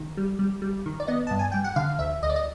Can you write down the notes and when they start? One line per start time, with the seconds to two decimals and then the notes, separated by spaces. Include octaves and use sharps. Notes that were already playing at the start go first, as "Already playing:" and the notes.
Already playing: D#3
0.17 G3
0.39 G3
0.62 G3
0.86 D#3
1.00 D5
1.07 B3 D#5
1.27 G2 A5
1.39 G#5
1.52 G3 G5
1.64 F#5
1.76 D3 F5
1.99 D2 E5
2.23 D2 D#5
2.30 D5
2.36 D#5